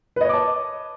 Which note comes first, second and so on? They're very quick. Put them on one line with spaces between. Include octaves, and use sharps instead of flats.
B4 D#5 C#5 D6 A5